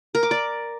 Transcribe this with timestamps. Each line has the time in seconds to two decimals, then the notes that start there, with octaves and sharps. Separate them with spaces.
0.15 A#4
0.23 D6
0.31 D5